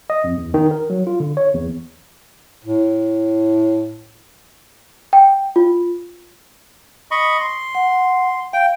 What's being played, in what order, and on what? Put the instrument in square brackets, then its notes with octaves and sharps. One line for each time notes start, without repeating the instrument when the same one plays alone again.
[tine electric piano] D#5
F2
E2
D#3
A#4
F#3
F4
D3
C#5
E2
[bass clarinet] A2
[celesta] G5
F4
[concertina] D#5 B5 C#6
C6
[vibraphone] F#5
[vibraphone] F5 [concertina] G5